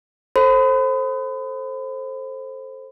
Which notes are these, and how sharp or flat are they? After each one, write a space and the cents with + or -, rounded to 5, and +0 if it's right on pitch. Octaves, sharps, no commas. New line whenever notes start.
A4 +0 C5 +15 B5 +35